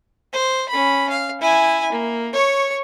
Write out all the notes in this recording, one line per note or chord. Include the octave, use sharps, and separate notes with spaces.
C5
C#4 B5
F5
E4 G#5
A#3
C#5 C#6